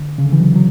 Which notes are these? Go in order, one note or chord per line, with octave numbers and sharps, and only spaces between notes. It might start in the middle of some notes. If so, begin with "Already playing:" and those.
Already playing: D3
C#3
D3
E3
F#3
F#3